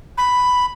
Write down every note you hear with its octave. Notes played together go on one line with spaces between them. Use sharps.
B5